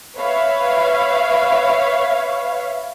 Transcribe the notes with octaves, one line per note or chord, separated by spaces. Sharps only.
B4 C#5 E5 F5